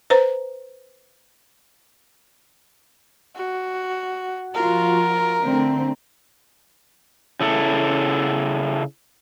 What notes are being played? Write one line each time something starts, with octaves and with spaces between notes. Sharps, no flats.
B4 C5 A#5
F#4
F3 F4 F#4 A#4
D3 A3 C4
C#3 E4 A4